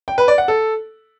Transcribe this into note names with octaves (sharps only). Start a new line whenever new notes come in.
G5
B4
D5
F#5
A4